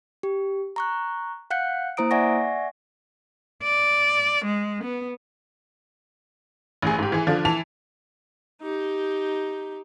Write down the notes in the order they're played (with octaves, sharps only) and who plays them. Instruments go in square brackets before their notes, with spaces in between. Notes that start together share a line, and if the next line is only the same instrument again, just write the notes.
[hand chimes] G4
A#5 C#6 F#6
F5 F#5 F#6 G6 C#7
A#3 E4 C5 A#5 D#6 D7
D5 E5 F#5 G#5 C#6 A#6
[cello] D5
G#3
B3
[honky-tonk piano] A1 G#4
G#2 G4
E3 G#4
D3 F3 D4 F4
E3 A5 F7
[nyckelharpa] D#4 G4